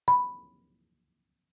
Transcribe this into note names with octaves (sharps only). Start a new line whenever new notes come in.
B5